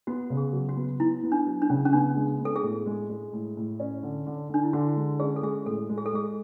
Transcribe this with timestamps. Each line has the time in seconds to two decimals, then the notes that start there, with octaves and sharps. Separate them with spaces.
0.07 B3 F#4
0.30 C#3
0.37 G#4
0.53 F#3
0.69 F#4
0.77 B3
1.00 B3 E4
1.24 B3
1.32 D4
1.47 F#3
1.62 D4
1.70 C#3 C#4
1.85 C#4
1.93 B3 D4
2.16 G#3
2.40 B3
2.45 A4
2.56 G#4
2.63 A2
2.86 G#3
3.10 G#3
3.33 A2
3.57 A2
3.80 C#4
4.03 D3
4.27 D3
4.49 D3 D4
4.63 E4
4.73 D3 F#4
4.96 G#3
5.19 C#4 G#4
5.36 A4
5.42 G#3 G#4
5.66 A2 A4
5.89 G#3
5.98 G#4
6.06 A4
6.13 G#3 G#4